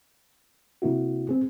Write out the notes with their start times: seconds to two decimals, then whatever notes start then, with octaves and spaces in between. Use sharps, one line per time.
0.82 C3 A#3 E4 F#4
1.29 C4 G#4